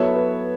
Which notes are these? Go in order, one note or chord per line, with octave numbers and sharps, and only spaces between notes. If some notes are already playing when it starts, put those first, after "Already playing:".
Already playing: F#3 B3 E4 A4 C#5 E5
B4